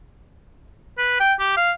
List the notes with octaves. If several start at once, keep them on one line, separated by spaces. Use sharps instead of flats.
B4
G5
G4
F5